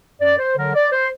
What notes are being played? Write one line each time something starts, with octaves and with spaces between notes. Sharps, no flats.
F#2 D5
C5
D3 F#3 A#4
D5
C5